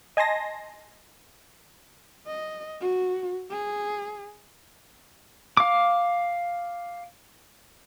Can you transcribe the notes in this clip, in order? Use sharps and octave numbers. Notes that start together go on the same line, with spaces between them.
D#5 G#5 A5 C6 A#6
D#5
F#4
G#4
F5 D6